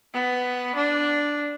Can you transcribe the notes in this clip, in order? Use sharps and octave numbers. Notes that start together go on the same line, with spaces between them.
B3
D4